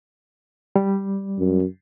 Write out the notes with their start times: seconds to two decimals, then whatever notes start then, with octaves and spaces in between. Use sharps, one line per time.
0.76 G3
1.39 F#2